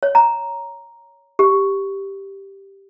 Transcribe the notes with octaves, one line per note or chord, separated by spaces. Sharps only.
C#5
A#5
G4